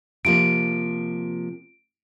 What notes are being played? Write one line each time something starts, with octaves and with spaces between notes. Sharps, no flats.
C3 F3 A#3 D7